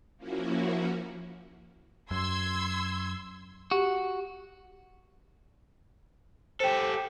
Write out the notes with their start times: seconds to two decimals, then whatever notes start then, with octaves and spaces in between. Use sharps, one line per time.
0.17 F3 A#3 C#4 E4 F#4
2.11 F#2 C6 E6 G#6
3.71 F#4 G4
6.60 G4 A4 C5 G5